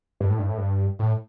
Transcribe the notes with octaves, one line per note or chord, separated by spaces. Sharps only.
G2
A2
G2
A2
G2
A2